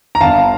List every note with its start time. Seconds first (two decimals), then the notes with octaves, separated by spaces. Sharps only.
0.15 A#5
0.21 G1 F5 A5